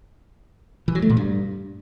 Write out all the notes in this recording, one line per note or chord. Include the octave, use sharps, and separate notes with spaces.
E3
F#3
A3
A#2
G2